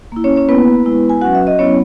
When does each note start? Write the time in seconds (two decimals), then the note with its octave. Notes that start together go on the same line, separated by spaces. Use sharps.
0.12 A#3 E4
0.24 C#4 C#5
0.36 C#4 C#5
0.49 A#3 B3 E4 B4
0.85 G#3 B3 E4
1.10 G#5
1.21 F#3 C#4 F#4 F#5
1.35 E5
1.47 D#5
1.59 F#3 B3 C#4 E4 C#5